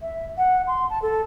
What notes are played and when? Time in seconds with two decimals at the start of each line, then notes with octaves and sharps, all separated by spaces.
0.01 E5
0.38 F#5
0.67 C6
0.90 A5
1.02 A4